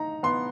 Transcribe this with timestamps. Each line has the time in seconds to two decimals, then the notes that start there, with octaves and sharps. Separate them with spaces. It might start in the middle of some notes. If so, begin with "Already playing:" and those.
Already playing: D#4 A#5
0.23 B3 C6